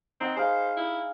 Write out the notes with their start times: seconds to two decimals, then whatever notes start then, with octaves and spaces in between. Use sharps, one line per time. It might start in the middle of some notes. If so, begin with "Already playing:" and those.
0.21 C4 D#4 F#5
0.37 G#4 C5 D#5 F5
0.77 E4